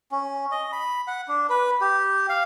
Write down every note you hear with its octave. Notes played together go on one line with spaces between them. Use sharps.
C#4
D#5
B5
F#5
D4
B4
G4
F5